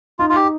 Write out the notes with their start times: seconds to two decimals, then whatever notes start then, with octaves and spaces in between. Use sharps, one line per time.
0.19 D#4 F4
0.30 F4
0.36 G4